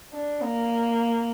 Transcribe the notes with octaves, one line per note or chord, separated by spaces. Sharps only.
D4
A#3